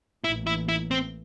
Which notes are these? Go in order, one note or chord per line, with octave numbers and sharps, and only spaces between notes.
A1 A2 E3 A#3 E4
E4
E4
C4